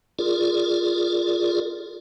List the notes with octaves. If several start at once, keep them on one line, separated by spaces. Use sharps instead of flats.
F4 G#4 A#4 D5